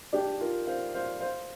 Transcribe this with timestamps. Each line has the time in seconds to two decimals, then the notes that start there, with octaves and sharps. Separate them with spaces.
0.13 D4 G4
0.41 F4 A#4
0.67 C5 F5
0.94 C5 F5
1.20 C5 F5